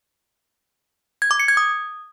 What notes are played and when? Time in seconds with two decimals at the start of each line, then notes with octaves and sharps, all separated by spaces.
1.22 G#6
1.31 D6
1.40 C#7
1.48 G#6
1.57 D#6